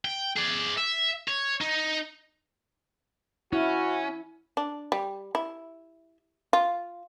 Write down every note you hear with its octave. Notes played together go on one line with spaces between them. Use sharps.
G5
G#4 D5
E5
C#5
D#4
C#4 E4 F#4
D4
G3
E4
F4